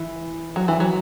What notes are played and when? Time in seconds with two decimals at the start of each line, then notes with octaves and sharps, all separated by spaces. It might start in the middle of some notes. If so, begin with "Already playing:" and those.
Already playing: E3
0.56 F#3
0.68 E3
0.80 F#3